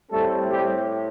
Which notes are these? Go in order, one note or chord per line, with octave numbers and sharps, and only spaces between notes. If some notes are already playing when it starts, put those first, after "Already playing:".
A2 G3 A3 C4 A4
G3 G4